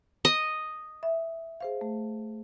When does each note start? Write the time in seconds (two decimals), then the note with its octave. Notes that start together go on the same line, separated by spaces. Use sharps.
0.25 D#5
1.03 E5
1.61 G#4 C5 F5
1.81 A3